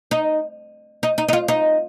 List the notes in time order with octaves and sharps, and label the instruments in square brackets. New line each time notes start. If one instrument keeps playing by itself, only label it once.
[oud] D#4
D#4
D#4
D#4
F4
D#4